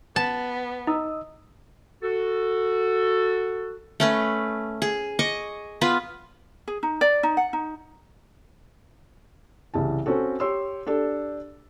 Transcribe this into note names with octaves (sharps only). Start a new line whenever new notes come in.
B3 A5
D#4 D#5 D#6 E6
F#4 A4
A3 C#4 B4
G#4
D#5 C#6 D6
B3 F4 B4
G#4
D#4
D5
D#4
F#5
D#4
C2 C#3 E3 A5
C4 C#4 F#4 A4
G4 C#5 C6 E6
D4 G4 A4